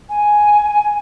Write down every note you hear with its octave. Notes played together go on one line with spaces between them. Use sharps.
G#5